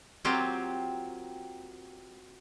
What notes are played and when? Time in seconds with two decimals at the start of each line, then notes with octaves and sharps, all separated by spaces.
0.25 F#3 A#3 C4 F4 G4